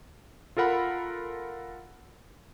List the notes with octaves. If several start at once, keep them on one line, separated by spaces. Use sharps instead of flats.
F4 A4 A#4 F#5 B5